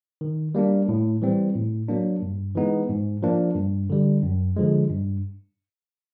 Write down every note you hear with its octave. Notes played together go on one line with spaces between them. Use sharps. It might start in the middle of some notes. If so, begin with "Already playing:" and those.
D#3
G3 A#3 D4
A2
E3 G3 C4
A2
F#3 A#3 D4
G2
E3 G#3 B3 D#4
G#2
F3 A#3 D4
G2
D3 G3
F#2
D3 F3 G#3
G2